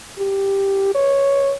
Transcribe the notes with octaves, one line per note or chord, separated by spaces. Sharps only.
G4
C#5